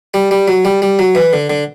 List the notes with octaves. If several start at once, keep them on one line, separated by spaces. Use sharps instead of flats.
G3
G3
F#3
G3
G3
F#3
E3
D3
D3